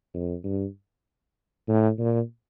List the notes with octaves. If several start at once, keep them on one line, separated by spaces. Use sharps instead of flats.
F2
G2
A2
A#2